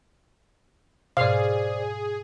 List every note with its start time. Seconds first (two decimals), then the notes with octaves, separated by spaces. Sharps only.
1.17 G#2 B2 G#4 C5 D5 F5